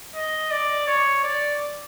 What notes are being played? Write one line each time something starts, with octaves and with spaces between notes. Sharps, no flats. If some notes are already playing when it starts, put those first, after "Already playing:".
D#5
D5
C#5
D5